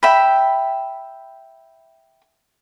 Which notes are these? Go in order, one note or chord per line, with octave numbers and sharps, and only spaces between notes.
E5 G5 B5